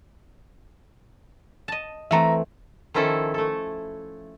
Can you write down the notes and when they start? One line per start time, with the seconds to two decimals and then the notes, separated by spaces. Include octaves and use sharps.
1.68 D#5 A5
2.11 E3 A3 C4 E5 A#5
2.94 D#3 F3 C#4 E4 A4
3.34 A3 A4